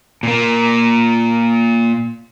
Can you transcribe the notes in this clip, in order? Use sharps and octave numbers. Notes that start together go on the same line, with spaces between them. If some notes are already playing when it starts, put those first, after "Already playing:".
A#2 A#3